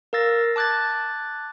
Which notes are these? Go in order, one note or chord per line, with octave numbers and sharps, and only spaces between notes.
A#4 F5 E6 A6 A#6
A5 D6 F#6 G#6 A6